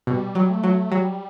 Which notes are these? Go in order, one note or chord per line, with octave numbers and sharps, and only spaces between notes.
B2 G3
F#3
A3
F#3
F#3 G3